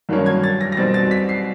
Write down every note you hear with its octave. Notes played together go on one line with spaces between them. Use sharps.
G2 D#3 F#3 A#3 C#4
G#6
A6
A#6
A#6
B2 G3 C4 A6
A6
B6
C7